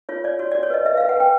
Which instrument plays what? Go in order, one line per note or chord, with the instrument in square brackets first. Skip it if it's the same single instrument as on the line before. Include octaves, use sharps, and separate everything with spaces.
[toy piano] F4 C#5
C#5 D5
F#4 C#5
D5
F#4
C#5
B4 D#5
B4 E5
F5
B4
F#5
B4 G5